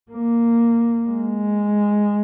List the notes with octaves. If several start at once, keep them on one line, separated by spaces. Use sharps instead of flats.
A#3
G#3